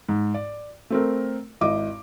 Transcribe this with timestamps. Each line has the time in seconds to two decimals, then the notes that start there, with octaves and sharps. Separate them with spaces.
0.09 G#2
0.34 D5
0.90 A3 C4 A#4
1.61 G#1 E4 D#5 D6